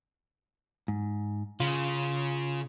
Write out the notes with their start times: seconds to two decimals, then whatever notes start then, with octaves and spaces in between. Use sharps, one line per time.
0.88 G#2
1.60 C#3 F4